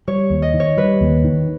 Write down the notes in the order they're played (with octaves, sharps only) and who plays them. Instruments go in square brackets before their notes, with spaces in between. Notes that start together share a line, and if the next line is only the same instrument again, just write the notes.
[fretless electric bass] G3 [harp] C#5
[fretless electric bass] D#2
[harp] D#5
[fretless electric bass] D#3
[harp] C#5
[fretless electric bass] G3 [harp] B4
[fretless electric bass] D#2
D#3